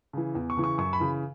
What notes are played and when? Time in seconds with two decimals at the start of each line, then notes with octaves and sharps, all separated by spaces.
0.13 C#3 E3
0.35 E2
0.50 C#6
0.57 C#3 E3
0.64 C#6
0.78 F#2 C#6
0.93 B5
1.00 C#3 E3